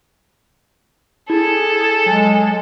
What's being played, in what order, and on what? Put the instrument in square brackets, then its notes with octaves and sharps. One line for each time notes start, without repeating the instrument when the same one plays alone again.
[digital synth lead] E4 [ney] G#4 [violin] A4
[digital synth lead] F#3 [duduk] G#3 [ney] G#5